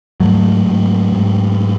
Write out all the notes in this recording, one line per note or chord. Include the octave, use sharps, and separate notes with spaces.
G#2 F#3 A3
G#2
G#2